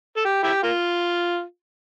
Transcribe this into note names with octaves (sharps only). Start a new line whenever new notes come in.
A4
G4
E4 G4
A#3 F4